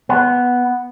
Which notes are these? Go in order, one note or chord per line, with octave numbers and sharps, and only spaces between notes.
B3